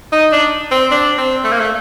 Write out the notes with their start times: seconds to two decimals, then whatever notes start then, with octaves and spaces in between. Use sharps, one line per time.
0.12 D#4
0.32 D4
0.71 C4
0.91 D4
1.18 C4
1.44 A3
1.52 A#3
1.61 A3